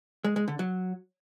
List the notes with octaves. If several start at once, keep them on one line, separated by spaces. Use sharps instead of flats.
G#3
G#3
D3
F#3